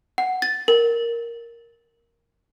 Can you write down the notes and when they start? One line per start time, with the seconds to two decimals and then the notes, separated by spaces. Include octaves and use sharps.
0.18 F#5
0.42 A6
0.68 A#4